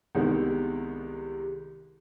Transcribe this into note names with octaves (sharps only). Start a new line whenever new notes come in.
C2 C3 D#3 G#3 B3